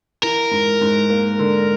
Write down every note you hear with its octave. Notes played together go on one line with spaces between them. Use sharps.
E3 A#4
G#2
G#2
A#3
D3